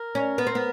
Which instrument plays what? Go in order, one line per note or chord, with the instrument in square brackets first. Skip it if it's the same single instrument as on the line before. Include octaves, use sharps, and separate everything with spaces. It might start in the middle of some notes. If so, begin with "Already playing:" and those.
Already playing: [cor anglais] A#4
[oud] C#4
B3
C4
B3